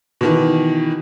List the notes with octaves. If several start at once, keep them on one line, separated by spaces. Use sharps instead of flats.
B2 D#3 E3